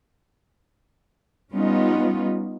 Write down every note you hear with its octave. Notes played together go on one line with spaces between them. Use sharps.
G3 B3 C#4 D#4 F4